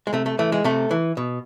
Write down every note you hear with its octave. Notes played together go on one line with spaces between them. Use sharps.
G#3
C3 A3
A3
E3 A3
G#3
C3 A3
E3
B2